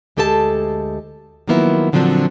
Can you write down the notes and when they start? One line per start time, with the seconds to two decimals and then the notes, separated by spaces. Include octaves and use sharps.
0.17 D2 G#3 G4 A4 B4 A5
1.48 D#3 F3 F#3 A#3 B3 E4
1.93 A#2 D3 F3 F#3 C4 D4